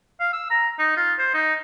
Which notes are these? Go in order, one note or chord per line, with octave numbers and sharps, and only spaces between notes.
F5
E6
A#5
D#4
F4
C5
D#4